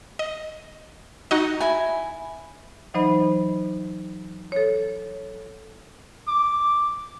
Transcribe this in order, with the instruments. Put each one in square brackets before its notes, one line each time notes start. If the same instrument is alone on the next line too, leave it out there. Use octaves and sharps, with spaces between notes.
[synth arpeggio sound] D#5
D#4 F#4 D#5
[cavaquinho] E4 G#5
[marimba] E3 F#3 D#4 C5 D#5 B5
A4 C#5
[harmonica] D6